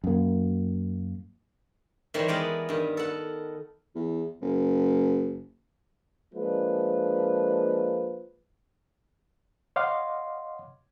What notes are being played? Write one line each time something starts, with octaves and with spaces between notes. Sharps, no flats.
F#2 A#3
D#3 E3 G3 C5 C#5
G#3 B3 A#4 D5 F#5 G5
G2 D#3
A4 F#5
E2
F#1
F3 G#3 A#3 D4 B4
C#5 D#5 F5 F#5 C6 D6